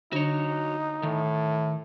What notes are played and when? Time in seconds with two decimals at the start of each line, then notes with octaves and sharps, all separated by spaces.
0.13 D3 D4 D#4 F#4 C#5
1.03 A2 D#3